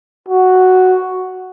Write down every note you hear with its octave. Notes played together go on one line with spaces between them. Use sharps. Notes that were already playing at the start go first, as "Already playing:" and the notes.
F#4